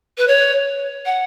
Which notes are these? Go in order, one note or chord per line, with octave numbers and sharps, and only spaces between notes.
B4
C#5
F#5